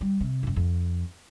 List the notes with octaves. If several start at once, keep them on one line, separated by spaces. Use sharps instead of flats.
G3
C3
C#2 F#2
F2